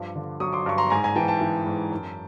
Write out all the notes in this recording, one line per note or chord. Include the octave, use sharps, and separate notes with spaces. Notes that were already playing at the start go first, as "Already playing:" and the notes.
Already playing: G2 F3 C6 D6
D3
F#3 C#6 D#6
C6 D6
G2 C#6
A#5 C6
G#2 G#5 A#5
G#5 A#5
E3 G5 A5
G5 A5
E3
G#2
F#2